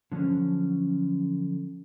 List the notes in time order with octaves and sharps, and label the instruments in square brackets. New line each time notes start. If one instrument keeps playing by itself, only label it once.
[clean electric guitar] D3 F3 F#3 C#4